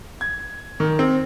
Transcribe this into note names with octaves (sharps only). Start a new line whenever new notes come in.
G#6
D#3
C4